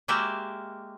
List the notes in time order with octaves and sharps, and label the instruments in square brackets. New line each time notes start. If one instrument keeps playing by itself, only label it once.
[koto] G#3 A#3 F#4 G4 D5 E5